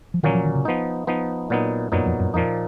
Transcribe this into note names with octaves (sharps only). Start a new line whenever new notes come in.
F3
A#2 D#3 F#3 A#3 C#4
F3
D#3
C#3
F3 B3 D#4
F3 B3 D#4
A#2 F#3 B3 D#4
F#2 A#2 F#3 B3 D#4
F2
F#2
F2 A#2 F3 A#3 D#4